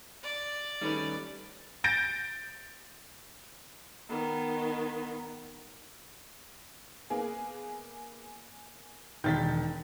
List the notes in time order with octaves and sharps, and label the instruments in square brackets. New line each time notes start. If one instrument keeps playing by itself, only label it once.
[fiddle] D5
[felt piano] D#3 A3 D#4 [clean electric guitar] G3 C#4 B4
[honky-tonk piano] G6 A6 A#6 D7
[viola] D#3 B3
[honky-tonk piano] A#3 B3 G#4
[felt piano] E1 D#3 [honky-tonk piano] G6 A6 B6